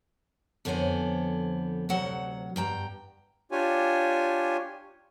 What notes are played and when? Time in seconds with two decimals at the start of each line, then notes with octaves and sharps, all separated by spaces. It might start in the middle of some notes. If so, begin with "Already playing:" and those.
0.65 F2 D3 B3 C5 C#5 G#5
1.89 D2 C3 F#3 F#5
2.56 G2 G5 A5 A#5
3.52 D4 F4 G4 C#5 G#5